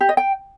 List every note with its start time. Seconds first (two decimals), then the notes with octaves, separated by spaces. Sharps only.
0.01 G4
0.09 D#5
0.17 G5